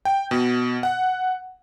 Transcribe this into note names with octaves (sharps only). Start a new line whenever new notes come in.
G5
B2
F#5